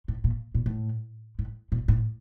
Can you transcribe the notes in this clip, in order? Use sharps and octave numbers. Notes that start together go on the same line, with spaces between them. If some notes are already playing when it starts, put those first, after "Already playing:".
A2
A#2
A#2
A2
A2
A#2
A2